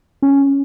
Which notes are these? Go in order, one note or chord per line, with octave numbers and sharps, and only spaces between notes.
C#4